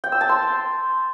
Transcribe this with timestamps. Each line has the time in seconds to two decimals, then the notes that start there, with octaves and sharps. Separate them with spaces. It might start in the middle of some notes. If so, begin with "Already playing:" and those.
0.04 G5
0.12 E6
0.21 A5
0.29 C6